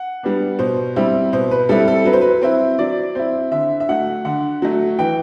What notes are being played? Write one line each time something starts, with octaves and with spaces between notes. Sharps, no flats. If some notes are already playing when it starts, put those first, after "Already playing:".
Already playing: F#5
G3 B3 D4
B2 C5
G3 C4 E4
B2 C5
B4
G3 C4 E4 A4
A4
F#3 B4
C5
B4
C4 E4 C5
F#3 D5
C4 E4 C5
D3 E5
E5
F#3 A3 F#5
D3 F#5
F#3 A3
E3 G5